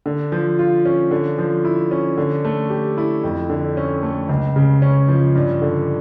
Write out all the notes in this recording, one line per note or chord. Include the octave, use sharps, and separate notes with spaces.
D3
F3
F4
C#4
D3
F3
E4
C#4
D3
A3
G4
E4
F2
D3
C#4
A3
C#2
C#3
C#4
F3
G2
D3